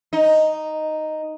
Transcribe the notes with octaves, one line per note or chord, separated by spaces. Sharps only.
D#4